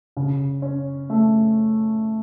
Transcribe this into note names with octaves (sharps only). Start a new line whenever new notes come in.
C#3
C#4
A3